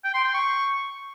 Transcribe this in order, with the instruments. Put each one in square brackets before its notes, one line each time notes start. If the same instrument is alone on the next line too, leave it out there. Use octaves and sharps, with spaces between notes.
[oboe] G5
C6
G5
C#6